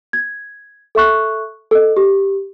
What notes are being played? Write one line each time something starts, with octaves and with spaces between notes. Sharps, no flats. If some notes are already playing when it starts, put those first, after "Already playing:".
G#6
A4 E5 C#6 F#6
A4 D#5
G4